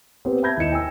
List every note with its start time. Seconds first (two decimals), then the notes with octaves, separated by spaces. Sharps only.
0.25 B3 C4 G4 B4 C5
0.43 E5 A5 B5 G6 G#6 A#6
0.57 D#2 E4 D#5 C#7 E7
0.72 G5 G#5 E6